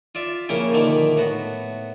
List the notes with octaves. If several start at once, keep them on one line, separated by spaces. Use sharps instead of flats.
F4 D5 E5
A#1 C#3 A#3 C#4 E4 G5
A#2 D3 D#3 F3 E4
A2 B3 F#4